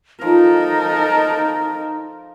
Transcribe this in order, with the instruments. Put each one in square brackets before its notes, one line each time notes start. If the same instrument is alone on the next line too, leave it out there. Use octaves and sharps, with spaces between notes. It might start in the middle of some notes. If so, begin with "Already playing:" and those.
[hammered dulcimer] F3 [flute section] D#4 [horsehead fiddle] A4 A#4